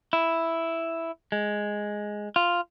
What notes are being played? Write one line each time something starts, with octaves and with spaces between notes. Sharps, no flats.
E4
G#3
F4